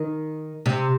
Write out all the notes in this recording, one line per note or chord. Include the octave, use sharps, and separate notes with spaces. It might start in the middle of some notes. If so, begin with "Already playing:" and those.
Already playing: D#3
C3